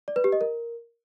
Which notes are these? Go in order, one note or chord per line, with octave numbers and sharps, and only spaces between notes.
D5
B4
G4
D#5
A#4